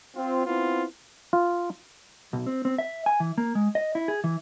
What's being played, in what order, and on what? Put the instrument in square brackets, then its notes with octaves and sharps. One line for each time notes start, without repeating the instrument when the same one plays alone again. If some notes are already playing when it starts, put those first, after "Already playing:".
[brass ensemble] C4 F4
B3 C4 E4 F4
[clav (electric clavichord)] F4
[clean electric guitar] B1
C4
C4
E5
G#5
E3
A#3
G#3
D#5
E4
G#4
E3